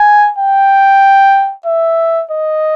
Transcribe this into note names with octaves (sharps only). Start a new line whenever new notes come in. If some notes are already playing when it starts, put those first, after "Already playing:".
Already playing: G#5
G5
E5
D#5